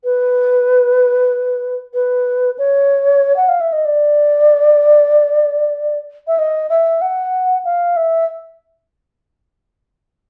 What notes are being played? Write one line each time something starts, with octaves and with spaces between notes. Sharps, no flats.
B4
B4
C#5
F#5
F5
E5
D#5
D5
E5
D#5
E5
F#5
F5
E5